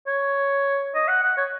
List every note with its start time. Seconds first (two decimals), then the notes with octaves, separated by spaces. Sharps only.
0.07 C#5
0.95 D#5
1.08 F#5
1.23 F#5
1.37 C#5